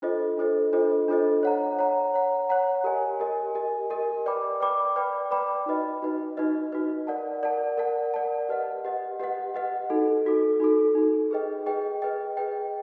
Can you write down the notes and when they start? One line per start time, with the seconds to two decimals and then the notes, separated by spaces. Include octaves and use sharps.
0.02 D4 F4 A4 C5 D#5
0.37 D4 F4 A4 C5 D#5
0.73 D4 F4 A4 C5 D#5
1.08 D4 F4 A4 C5 D#5
1.43 C#5 F#5 A#5
1.79 C#5 F#5 A#5
2.14 C#5 F#5 A#5
2.49 C#5 F#5 A#5
2.84 G4 A#4 D#5 G#5
3.20 G4 A#4 D#5 G#5
3.55 G4 A#4 D#5 G#5
3.90 G4 A#4 D#5 G#5
4.26 B4 D5 G5 B5 D6
4.60 B4 D5 G5 B5 D6
4.96 B4 D5 G5 B5 D6
5.31 B4 D5 G5 B5 D6
5.66 D#4 F#4 B4 D#5
6.02 D#4 F#4 B4 D#5
6.37 D#4 F#4 B4 D#5
6.72 D#4 F#4 B4 D#5
7.07 A#4 D5 F#5 A5
7.43 A#4 D5 F#5 A5
7.78 A#4 D5 F#5 A5
8.14 A#4 D5 F#5 A5
8.49 G4 B4 D#5 F#5
8.84 G4 B4 D#5 F#5
9.20 G4 B4 D#5 F#5
9.54 G4 B4 D#5 F#5
9.90 D#4 F#4 A4
10.25 D#4 F#4 A4
10.60 D#4 F#4 A4
10.95 D#4 F#4 A4
11.31 G#4 B4 D#5 G5
11.66 G#4 B4 D#5 G5
12.02 G#4 B4 D#5 G5
12.37 G#4 B4 D#5 G5